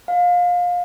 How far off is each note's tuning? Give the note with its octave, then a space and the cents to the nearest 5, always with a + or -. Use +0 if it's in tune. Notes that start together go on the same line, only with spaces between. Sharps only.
F5 +25